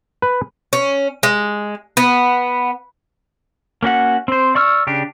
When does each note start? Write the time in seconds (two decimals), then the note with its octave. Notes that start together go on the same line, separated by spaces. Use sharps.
0.22 B4
0.73 C#4
1.23 G#3
1.97 B3
3.83 A#3 C#4 F#4 F#5
4.28 C4 C5
4.55 D5 C#6 E6 F6
4.87 C#3 D4 G4